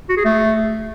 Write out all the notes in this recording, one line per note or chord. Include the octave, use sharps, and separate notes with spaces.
F#4
G#4
A3